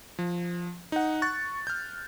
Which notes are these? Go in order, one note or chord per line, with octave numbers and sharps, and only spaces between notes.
F3
D#4 F#5
C#6 F#6 A6
F6 G6